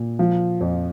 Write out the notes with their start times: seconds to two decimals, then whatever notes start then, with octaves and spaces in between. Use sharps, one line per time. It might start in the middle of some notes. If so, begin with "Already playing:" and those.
Already playing: A#2
0.19 F3
0.61 F2